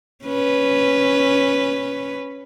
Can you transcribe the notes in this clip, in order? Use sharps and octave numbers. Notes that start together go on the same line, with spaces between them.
C#4 B4